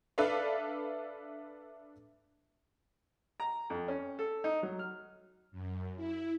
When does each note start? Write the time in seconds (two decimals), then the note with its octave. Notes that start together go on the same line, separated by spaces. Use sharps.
0.18 D4 A4 B4 D5 E5 F5
3.40 A#5
3.70 F2
3.88 C#4
4.19 A4
4.44 D#4
4.63 F#3
4.79 F6
5.52 F#2
5.96 E4